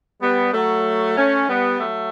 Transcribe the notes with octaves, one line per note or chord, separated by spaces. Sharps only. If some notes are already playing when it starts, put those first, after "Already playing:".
G3 B3
F#3 A3
A3 C#4
G3 B3
F#3 A3